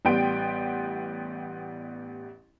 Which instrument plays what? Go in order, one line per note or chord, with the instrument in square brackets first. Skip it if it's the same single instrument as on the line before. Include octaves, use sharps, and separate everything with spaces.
[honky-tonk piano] A1 G3 B3 G5 C6 D7